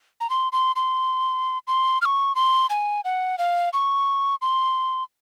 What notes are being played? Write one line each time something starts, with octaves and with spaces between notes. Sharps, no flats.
A#5
C6
C6
C6
C6
F6
C#6
C6
G#5
F#5
F5
C#6
C6